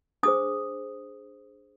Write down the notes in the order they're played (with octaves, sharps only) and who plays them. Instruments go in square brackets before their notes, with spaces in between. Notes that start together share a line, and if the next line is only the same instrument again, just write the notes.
[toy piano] D4 G#4 C5 D#6